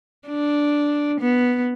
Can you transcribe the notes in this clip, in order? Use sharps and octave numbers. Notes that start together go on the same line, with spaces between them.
D4
B3